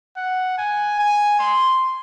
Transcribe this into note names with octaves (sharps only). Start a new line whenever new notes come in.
F#5
G#5
G#5
C6